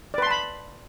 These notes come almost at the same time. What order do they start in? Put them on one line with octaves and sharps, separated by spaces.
D5 B4 C6 A5 B5